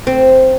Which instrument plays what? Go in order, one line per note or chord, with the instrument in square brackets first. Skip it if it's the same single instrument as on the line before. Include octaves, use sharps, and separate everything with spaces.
[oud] C4